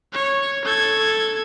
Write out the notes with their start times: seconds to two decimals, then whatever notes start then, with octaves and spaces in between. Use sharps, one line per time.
0.13 C#5
0.65 A4 G#6